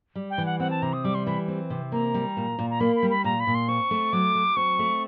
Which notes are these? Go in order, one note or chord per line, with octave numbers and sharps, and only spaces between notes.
G3
G5
E3
F#5
C4 F#5
A5
C3 A#5
D#6
G3 D6
C6
E3 B5
C4
C3
A#3 A#5
G3
A#2
A#2
A#5
A#3 B5
B5
G3
B5
A#2 A#5
B5
A#2
C6
C4 C#6
A3
F#3 D6
F#3
C4 C#6
A3